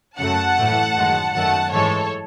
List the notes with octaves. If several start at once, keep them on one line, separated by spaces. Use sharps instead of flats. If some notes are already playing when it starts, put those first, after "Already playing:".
F#2 C#3 F#3 A3 F#5 A5
A2 E3 A3
F#2 D#3 G#3
F#2 D#3 A3 F#5 A5
G#2 E3 G#3 A4 C#5